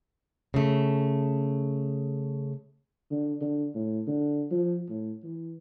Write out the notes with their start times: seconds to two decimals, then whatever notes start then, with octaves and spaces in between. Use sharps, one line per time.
0.54 C#3 A3
3.11 D3
3.41 D3
3.75 A2
4.07 D3
4.51 F3
4.89 A2
5.23 E3